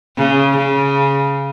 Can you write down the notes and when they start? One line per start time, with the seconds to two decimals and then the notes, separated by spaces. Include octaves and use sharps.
0.17 C#3
0.57 C#3